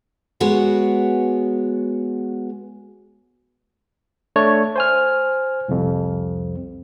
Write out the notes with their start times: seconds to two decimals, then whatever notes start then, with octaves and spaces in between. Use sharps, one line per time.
0.40 G#3 B3 F#4 B4 C#5
4.36 A3 D4 C#5 D5
4.76 C5 G#5 F6
5.68 C2 F2